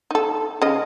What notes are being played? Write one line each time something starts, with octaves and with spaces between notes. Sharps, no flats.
D#4 A4
C#3 D#5